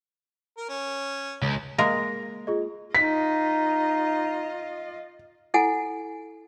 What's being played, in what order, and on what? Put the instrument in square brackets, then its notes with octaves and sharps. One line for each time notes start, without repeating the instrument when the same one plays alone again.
[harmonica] A#4
C#4
[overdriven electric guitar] C#2
[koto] G#3 A#3 A#4 [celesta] A#6
[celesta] F4 G#4 D#5
[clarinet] D#4 [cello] F4 D#5 [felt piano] B6
[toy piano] E4 A4 F#5 G#5